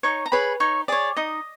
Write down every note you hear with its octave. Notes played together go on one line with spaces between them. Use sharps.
D#4 C#5 C#6
A#5
G#4 B4 C#5 B5
D#4 C#5 C#6
G#4 C#5 D5 D6
D#4 D#5 D#6